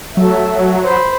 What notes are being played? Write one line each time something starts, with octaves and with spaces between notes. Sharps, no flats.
F#3 A3 E5
C5 B5